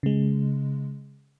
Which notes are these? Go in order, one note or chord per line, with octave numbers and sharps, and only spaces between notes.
C#3 G#3